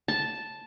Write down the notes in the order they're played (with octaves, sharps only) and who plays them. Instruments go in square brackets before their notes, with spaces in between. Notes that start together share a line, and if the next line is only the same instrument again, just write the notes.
[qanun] A5